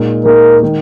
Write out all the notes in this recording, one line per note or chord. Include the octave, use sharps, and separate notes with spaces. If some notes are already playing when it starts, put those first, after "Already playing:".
Already playing: A#2 G#3 D#4
A#2 G#3 D#4 A#4
D#3 G#3